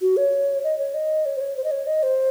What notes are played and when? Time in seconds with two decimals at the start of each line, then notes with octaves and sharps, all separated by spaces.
0.01 F#4
0.17 C#5
0.64 D#5
0.78 C#5
0.94 D#5
1.26 C#5
1.37 C5
1.41 C#5
1.56 C5
1.64 D#5
1.71 C#5
1.87 D#5
2.03 C5